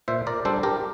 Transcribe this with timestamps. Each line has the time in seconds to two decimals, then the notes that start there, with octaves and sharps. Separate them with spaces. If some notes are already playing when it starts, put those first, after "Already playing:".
0.08 A#2 C5 E5
0.27 A#4 D5
0.45 G3 D4 A4 C5
0.63 G4 A#4